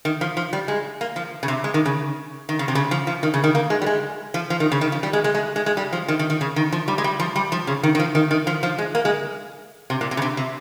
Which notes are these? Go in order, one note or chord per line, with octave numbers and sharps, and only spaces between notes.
D#3
F3
F3
G3
G#3
A#3
F3
C#3
C3
G#3
D#3
C#3
D#3
C#3
C3
C#3
F3
F3
D#3
C#3
D#3
A#3
G#3
G3
G#3
F3
F3
D#3
C#3
D#3
F3
G3
G#3
G#3
G#3
G#3
G#3
G3
F3
D#3
D#3
D#3
C#3
D#3
F3
G3
G#3
G3
F3
G3
F3
C#3
D#3
D#3
F3
D#3
D#3
F3
F3
G#3
A#3
G#3
C3
A#2
C3
C#3
C3
C3